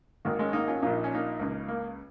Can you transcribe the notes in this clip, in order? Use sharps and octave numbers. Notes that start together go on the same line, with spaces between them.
G#1 G#2 D#3 A#3
G#3 C#4
A#3 D#4
C#4 F4
A#1 A#2 F4
D#4
C#4
A#3 D#4
C#2 C#3
A#3